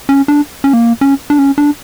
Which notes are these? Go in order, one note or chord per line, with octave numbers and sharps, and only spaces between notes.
C#4
D4
C#4
A#3
C#4
D4
C#4
D4